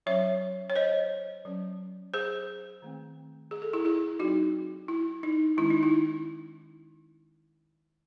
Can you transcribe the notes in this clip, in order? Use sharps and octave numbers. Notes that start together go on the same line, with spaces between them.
F#3 C#4 C#5 E5
C#5
C5 D#5
F#3 C#4
G#4 C5
D#3 A3 C4
G#4
A4
E4 G#4
E4 G#4
F#3 C4 D#4 F#4
E4
D#4
D#3 G#3 C#4 E4
D#4
E4